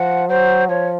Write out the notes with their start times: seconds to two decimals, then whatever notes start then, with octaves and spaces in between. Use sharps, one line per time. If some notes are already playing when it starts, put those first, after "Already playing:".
Already playing: F3 F#5
0.29 F#3 C5
0.68 F3 C#5